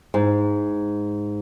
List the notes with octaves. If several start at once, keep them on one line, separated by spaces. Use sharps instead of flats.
G#2